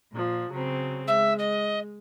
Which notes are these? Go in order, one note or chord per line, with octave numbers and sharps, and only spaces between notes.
A#2 F3
C#3 F#3 C4
G#3 E5
D#5